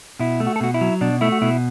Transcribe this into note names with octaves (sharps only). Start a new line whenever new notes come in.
B2 E4
A3
F#4
A4
B2 F#4
E4
F#3
B2 D4
A3 E4
F#4
B2 E4